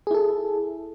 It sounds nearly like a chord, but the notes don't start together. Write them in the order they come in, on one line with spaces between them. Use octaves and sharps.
G#4 E4 A4